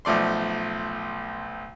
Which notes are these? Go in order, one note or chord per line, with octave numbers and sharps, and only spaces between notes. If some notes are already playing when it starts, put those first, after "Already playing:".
B1 F3 A3 D5 C6